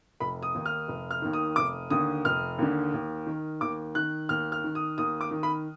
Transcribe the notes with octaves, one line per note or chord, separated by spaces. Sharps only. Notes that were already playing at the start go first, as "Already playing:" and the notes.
F1 B5
D#6
D#2 D#3
F6
F1
F6
D#2 D#3
D#6
F1 D6
D#2 D3 D#6
F1 F6
D#2 D3
D#2
D#3
D#2 D6
D#3 F#6
D#2 F6
F6
D#3
D#6
D#2 D#6
D6
D#3
B5